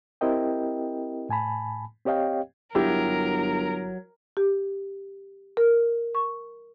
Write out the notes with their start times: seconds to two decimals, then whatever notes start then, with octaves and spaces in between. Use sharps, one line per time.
0.21 C4 E4 G4 A#4 D#5 G5
1.29 A2 G#5 A5 B5
2.05 C4 G4 C#5 D#5 F5 G5
2.75 G1 F#3 E4 G4 A#4
4.37 G4
5.57 A#4
6.15 C#6